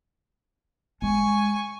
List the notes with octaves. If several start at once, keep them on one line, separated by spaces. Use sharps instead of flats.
G#3 G#5 C#6